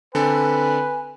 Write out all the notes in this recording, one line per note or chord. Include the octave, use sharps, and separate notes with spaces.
D3 C4 A4 B4 G#5